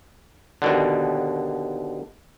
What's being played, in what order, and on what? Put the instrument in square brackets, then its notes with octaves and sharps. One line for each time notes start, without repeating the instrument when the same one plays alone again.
[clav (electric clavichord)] D#2 B2 D3